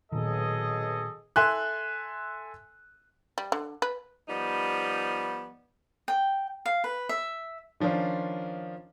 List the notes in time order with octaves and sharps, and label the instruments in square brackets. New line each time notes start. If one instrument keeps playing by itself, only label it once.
[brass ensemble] B1 D#5 [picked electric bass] A#2 D#3 [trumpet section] G#4 A4
[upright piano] A4 E5 G#5 C6 F#6
[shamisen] G3
D3
B4
[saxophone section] F3 G3 B3 D#4
[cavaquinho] G5
F5
B4
E5
[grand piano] D#3 F3 C#4 D4 F4